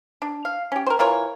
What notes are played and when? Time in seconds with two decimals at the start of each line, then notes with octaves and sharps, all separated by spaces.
0.22 D4
0.45 F5
0.72 C#4 G4
0.86 A#4 C5
0.99 E3 F4 A#4 C#5